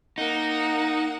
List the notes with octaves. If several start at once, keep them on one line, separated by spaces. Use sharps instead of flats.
A#3 D#4 F#5